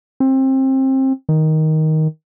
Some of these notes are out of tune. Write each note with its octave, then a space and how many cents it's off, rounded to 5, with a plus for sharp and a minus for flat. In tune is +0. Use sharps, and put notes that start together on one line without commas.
C4 +25
D#3 +10